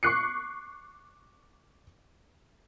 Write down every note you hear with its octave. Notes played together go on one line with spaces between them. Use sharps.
C#6 D6 F#6 C7 C#7